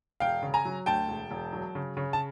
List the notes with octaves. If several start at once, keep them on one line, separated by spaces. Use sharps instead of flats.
E1 F5 G5
C#3
G#5 A#5
F#3
D2 G5 A5
E1
E1
F#3
C#3
C#3
A5